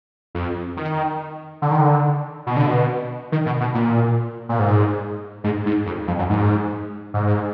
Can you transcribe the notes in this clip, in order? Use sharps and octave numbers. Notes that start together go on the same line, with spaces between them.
F2
D#3
D3
D#3
D3
B2
D3
B2
D#3
B2
B2
A#2
A#2
G#2
G#2
G#2
F2
F2
F#2
G#2
G#2